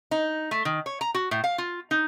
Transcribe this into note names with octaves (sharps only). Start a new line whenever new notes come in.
D#4
A3
D#3
C#5
A#5
F#4
A2
F5
F4
D#4